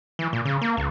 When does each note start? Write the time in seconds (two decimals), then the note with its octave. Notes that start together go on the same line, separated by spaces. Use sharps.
0.19 E3
0.33 A#2
0.45 C#3
0.61 A#3
0.77 C#2